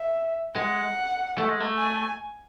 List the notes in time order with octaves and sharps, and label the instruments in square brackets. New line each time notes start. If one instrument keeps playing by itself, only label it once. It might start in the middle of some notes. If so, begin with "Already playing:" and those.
Already playing: [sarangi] E5
[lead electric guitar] G#3 [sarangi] F#5
[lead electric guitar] A3
G#3
A3
[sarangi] G#5